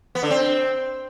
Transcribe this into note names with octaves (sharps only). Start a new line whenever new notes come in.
B3
D3
C4